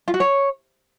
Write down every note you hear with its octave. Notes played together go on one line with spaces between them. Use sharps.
F4
F#4
C#5